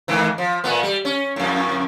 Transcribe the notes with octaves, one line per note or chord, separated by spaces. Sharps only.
G#2 D#3 E3
F3
A#2 A3 B3
G3
C#4
F2 A2